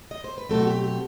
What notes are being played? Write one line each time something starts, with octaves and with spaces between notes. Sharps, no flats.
D#5
C5
B4
B2 F#3 A3 C4 A4
F#4
G4
G4